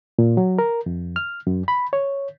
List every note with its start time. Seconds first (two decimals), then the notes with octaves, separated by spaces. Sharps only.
0.19 A#2
0.37 F#3
0.59 A#4
0.86 F2
1.16 F6
1.47 F#2
1.68 B5
1.93 C#5